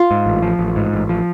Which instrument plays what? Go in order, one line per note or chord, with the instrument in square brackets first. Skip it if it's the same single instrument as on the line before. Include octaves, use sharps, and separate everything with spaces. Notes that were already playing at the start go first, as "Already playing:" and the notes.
Already playing: [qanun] F4
[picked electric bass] G#2
A1
F3
A1
G#2
A1
F3